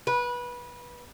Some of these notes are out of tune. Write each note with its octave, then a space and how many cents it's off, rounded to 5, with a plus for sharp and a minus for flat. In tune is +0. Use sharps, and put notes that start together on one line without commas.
B4 -20